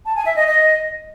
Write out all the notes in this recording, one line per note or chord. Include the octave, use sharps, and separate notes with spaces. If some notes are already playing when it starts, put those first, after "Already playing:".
A5
G#5
E5
D#5
D#5